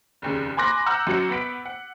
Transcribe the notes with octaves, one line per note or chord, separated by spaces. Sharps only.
F1 D#2 C#3
G#5 B5 C6 D6 F#6 A#6
F#5 A#5 E6 F#6 G6
F#2 F#3 F#4 C#7
B3 F#5 B6 D7
F#5